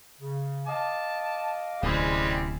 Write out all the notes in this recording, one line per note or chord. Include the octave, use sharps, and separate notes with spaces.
C#3
D#5 F5 A5 D6
D1 C3 G3 G#3 C4 C#4 E4